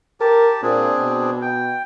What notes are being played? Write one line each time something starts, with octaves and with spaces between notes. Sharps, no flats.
G4 A#4 A5
A#2 C4 D4 G#4
B2
G5